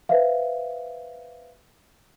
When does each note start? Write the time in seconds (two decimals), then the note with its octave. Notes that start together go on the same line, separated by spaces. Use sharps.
0.09 B4 C5 E5 F5